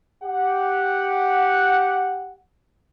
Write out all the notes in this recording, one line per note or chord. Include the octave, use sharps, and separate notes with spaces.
G4 F#5